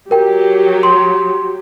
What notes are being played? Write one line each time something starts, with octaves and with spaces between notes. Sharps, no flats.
F#3 G4 A#4 G5
C6